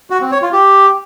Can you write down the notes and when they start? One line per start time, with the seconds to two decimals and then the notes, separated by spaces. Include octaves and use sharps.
0.10 F#4
0.21 C4
0.31 C#5
0.42 F4
0.53 G4